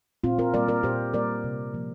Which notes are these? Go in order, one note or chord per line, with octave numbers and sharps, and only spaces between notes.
A#2 C4 F4
F4 A#4
G3 A#3 A#4 D5
A#4 D5
A#2 G4 C5
G3 A#3 A#4 D5
C3
F3 A#3